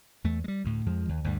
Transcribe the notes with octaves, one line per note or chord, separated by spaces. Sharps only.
E2 A3
G3 G#3
D2 A2
F2 F3 G#3
D#2
D2 G2 G3